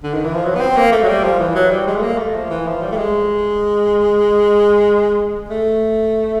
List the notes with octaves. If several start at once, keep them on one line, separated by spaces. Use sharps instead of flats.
D3
D#3
E3
F3
F#3
B3
C4
A#3
A3
F#3
G3
F3
E3
F#3
G3
G#3
A3
A#3
A3
F3
E3
F3
G3
A3
G#3
A3